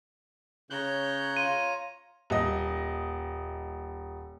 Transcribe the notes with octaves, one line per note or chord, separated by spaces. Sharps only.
C#3 C#5 A#5 F#6 G6
F4 D#7
D#1 D#5